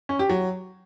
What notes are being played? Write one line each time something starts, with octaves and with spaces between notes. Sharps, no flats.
C#4
G4
F#3